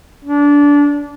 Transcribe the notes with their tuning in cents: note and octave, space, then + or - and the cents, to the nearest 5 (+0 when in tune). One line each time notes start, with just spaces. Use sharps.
D4 -20